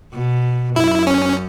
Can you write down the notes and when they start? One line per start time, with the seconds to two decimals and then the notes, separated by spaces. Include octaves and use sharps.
0.13 B2
0.76 F#2 E4
1.07 C#4